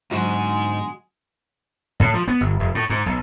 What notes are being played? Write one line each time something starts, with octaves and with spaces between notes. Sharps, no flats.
G#2 B2 D3 F#3 G#3 F#4
A2
F3
B3
G1
F1
A2
G#2
B1